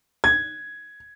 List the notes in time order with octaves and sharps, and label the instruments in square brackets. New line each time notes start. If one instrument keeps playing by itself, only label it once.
[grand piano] G#6